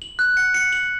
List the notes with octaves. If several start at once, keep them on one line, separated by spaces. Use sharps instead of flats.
F#7
F#6
C#7
C#7
F#7